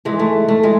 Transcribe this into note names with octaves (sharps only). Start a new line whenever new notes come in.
G#2 E3 G#3
A3
A3
E3 G#3